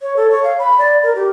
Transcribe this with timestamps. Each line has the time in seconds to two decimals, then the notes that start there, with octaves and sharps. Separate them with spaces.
0.01 C#5
0.16 A4
0.31 C#5
0.44 F5
0.59 B5
0.79 D5
1.03 A#4
1.15 G4